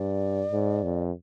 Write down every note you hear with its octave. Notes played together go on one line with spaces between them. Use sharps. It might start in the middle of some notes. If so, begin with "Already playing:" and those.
Already playing: G2 D5
G#2
F2